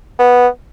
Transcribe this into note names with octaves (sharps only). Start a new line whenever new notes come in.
B3